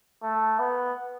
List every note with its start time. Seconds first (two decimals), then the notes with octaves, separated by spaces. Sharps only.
0.23 A3
0.59 B3